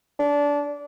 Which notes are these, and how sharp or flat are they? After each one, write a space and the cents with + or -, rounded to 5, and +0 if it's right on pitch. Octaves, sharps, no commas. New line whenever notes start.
D4 -20